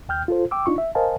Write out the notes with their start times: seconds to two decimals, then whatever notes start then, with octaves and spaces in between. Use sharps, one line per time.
0.09 D#2 G5 F6 G6
0.28 F4 A4 C5
0.51 G5 D6 E6
0.66 D4 D#4 F4 C#6
0.78 E5
0.95 A#4 C5 D#5 F5 G#5 A5